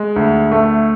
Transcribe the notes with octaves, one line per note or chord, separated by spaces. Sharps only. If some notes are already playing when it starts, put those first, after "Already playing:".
Already playing: G#3
D2
A3